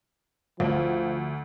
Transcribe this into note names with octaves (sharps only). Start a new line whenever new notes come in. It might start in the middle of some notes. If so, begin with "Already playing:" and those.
D2 F3